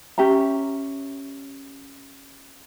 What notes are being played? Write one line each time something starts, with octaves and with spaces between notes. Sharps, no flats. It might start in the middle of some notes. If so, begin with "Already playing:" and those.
C#4 G4 E5 A#5